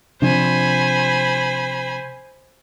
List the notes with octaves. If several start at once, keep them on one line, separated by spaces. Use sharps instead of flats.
C3 F3 D4 C5 G#5 B5